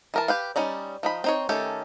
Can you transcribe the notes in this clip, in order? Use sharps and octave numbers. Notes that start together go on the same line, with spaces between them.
E3 A#4 A5
G4 B4 F5
G3 C#4 D#4 D5
F3 D#4 B5
C4 D#4 C#5
D#3 A3 C#4 G4 A4